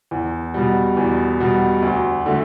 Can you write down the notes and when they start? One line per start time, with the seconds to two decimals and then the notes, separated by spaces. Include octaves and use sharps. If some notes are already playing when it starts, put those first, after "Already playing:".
0.11 E2
0.54 B2 G3
0.97 E2
1.40 B2 G3
1.83 D2
2.26 D3 A3